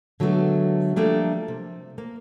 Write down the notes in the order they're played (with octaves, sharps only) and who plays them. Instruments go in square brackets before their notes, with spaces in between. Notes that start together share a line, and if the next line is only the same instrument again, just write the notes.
[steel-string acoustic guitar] D3 F#3 G#3 A3 B3
F3 G3 A3 A#3 D4
C3
A#3